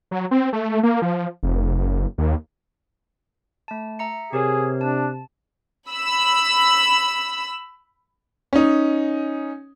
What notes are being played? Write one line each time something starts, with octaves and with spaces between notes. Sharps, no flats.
F#3
C4
A3
A#3
F3
F1
F#1
D#2
A3 A5
E5 A#5 C#7
C3 G4 G#4 A#4 C#5
D4 A5
B5 E6
C#4 D#4